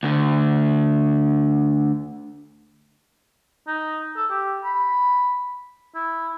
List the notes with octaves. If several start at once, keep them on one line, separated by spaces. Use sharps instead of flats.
D2 D3
D#4
A4
G4
B5
E4